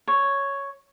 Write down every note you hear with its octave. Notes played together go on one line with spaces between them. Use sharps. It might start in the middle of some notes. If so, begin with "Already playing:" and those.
C#5